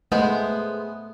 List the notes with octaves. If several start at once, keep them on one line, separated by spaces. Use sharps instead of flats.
G#3 A3 B3 C5